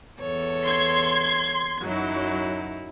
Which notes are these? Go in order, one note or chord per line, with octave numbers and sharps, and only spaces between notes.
E2 A4 C#5
C6 G#6
F#2 F#3 D#4 E4